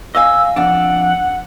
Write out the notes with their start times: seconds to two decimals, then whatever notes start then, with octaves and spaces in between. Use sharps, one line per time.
0.15 D#5 F5 G#5 E6
0.56 F2 D4 F#5